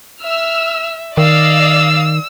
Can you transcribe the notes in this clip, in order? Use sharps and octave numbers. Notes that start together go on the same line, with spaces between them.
E5 E6 F6
D#3 D5 D#5 F5 E6